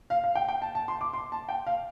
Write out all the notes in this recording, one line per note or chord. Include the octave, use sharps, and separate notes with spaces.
F5
F5
G5
G5
A5
A5
C6
D6
C6
A5
G5
F5